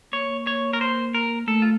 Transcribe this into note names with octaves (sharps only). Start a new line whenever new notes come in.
A#3 C#5
C#5
A#4
C5
A#4
A3 A4
F4